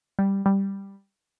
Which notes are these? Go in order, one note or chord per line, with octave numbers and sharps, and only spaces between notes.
G3
G3